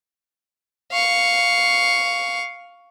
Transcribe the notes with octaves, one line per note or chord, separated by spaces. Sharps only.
F5 C#6